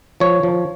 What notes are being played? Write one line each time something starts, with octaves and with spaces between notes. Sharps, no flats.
F3 C#5
F3